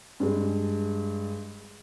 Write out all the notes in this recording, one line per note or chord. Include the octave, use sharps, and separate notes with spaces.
G2 G#3